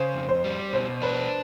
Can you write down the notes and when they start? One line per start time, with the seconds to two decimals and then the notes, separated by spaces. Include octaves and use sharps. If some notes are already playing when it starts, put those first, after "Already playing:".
Already playing: C#3 C5
0.14 F2
0.29 C5
0.44 G3
0.73 B2 C5
1.02 D4 B4